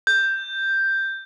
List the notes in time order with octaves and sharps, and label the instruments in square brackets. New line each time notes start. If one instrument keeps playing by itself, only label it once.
[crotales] G6